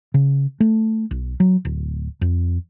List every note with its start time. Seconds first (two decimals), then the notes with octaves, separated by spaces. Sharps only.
0.14 C#3
0.60 A3
1.11 B1
1.40 F#3
1.65 D1
2.21 F2